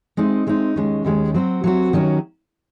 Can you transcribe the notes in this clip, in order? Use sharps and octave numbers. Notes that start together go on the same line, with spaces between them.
G#3 C4 D#4
G#3 C4 D#4
D#2 D#3 G#3 C#4
D#2 D#3 G#3 C#4
F#3 C4 F#4
F#3 C4 F#4
D#3 F#3 C#4